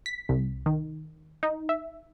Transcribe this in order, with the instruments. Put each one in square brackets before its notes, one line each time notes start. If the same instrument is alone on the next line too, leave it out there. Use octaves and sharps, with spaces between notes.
[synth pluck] B6
C2
D#3
D#4
E5